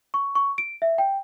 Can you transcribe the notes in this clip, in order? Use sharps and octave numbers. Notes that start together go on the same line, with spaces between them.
C#6
C#6
D7
E5
G5